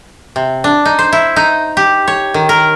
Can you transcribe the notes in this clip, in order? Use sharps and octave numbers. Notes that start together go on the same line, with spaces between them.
C3
D4
D#4
C5
E4
D#4
G4
C#5
D#3
A#4